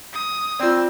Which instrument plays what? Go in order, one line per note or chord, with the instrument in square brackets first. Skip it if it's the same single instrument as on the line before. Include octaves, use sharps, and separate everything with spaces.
[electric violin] D#6
[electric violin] C4 E6 [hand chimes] F4 D5